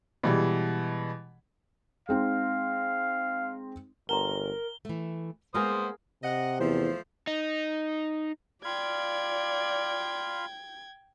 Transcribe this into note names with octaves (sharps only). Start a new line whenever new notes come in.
B2 E3 G3 G#3
G#3 C4 D#4 F5
G1 A#4 F#5 A#5 C6 G7
E3 A3
G#3 A#3 B3 G#4 A#4 C5 F5 D#6
C3 D#5 F#5
E2 F3 A3 C5
D#4
F4 D5 F5 G5 B5 G#6